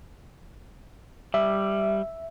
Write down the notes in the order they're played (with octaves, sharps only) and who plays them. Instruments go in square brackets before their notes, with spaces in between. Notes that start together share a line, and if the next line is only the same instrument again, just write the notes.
[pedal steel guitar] G3 [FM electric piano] E5